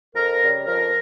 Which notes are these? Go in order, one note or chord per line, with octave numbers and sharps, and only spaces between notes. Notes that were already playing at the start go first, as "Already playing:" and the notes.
F2 A#4
C#3 G3
F2 A#4